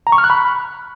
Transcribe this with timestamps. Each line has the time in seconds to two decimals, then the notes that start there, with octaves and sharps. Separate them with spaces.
0.07 A#5
0.12 C#6
0.18 F6
0.24 F#6
0.30 B5